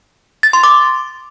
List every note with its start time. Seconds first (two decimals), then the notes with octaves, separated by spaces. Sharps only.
0.43 A6
0.53 C6
0.63 D6